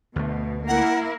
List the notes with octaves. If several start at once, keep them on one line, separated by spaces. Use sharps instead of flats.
D2 B2 A3
A#3 E4 A#4 F#5